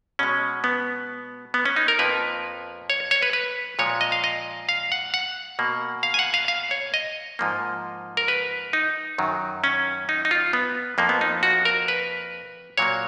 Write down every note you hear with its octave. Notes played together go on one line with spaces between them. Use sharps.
B2 G#3 C#4
B3
B3
C#4
D#4
A#4
F2 F3 A#3 B4
C#5
C#5
B4
B4
A#2 F3 G#3 C#5
D#5
F5
D#5
F5
F#5
F#5
B2 A#3
F5
G#5
F#5
F5
F5
C#5
D#5
G#2 F3 A#3
A#4
B4
D#4
F#2 D#3 F#3
C#4
D#4
D#4
F4
B3
F2 F3 A#3
B3
D#4
F#4
A#4
B4
A#2 F#3 A#3 C#5